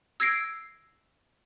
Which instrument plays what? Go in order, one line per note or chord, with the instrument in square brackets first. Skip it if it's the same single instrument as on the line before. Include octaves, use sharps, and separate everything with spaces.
[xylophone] E6 G#6 A#6 C7 D7